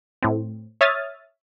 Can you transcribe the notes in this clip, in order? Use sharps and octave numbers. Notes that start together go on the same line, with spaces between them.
A2 C4
C#5 E5 D#6 F6 G#6 A6